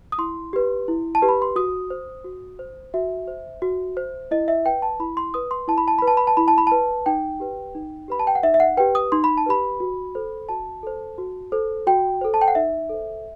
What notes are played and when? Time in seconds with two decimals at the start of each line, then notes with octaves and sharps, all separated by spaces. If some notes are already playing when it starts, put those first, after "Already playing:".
0.12 D#6
0.18 E4 C6
0.53 G4 B4
0.88 E4
1.15 A5
1.22 G4 B4
1.29 B5
1.42 C6
1.56 F#4 D#6
1.90 C5
2.25 F#4
2.59 C5
2.94 F#4 E5
3.28 C5
3.62 F#4
3.97 C5
4.31 E4 D#5
4.48 E5
4.65 B4 G5
4.82 A5
5.00 E4 B5
5.17 C6
5.34 B4 D#6
5.51 C6
5.68 E4 A5
5.78 B5
5.88 A5
5.98 B4 B5
6.08 A5
6.17 B5
6.27 A5
6.37 E4 B5
6.48 A5
6.58 B5
6.67 B4 A5
7.06 D#4 G5
7.40 G4 B4
7.75 D#4
8.08 G4 B4 B5
8.19 A5
8.27 G5
8.35 F#5
8.43 D#4 E5
8.54 E5
8.60 F#5
8.77 G4 B4 G5
8.95 D#6
9.12 D#4 C6
9.24 B5
9.37 A5
9.46 G4 B4 B5
9.80 F#4
10.15 A4 C5
10.49 F#4 A5
10.83 A4 C5
11.18 F#4
11.52 A4 C5
11.87 F#4 G5
12.21 A4 C5
12.34 A5
12.41 G5
12.48 F#5
12.55 D#4 E5
12.90 A4 C5